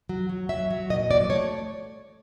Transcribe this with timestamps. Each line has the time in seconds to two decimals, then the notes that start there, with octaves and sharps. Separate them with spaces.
0.09 F#3
0.29 F#3
0.49 F#3 E5
0.70 F#3
0.90 A#2 D#5
1.11 F#3 D5
1.30 A3 C#5